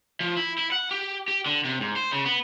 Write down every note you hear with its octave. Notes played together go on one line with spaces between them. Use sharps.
F3
E4
E4
F#5
G4
G4
D3
C3
G#2
C5
C#3
B3